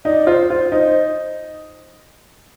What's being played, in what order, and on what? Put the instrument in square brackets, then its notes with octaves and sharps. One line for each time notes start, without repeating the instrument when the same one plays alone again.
[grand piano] D#4 [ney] D5
[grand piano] F4 [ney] C5
[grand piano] F4 [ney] C5
[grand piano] D#4 [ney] C5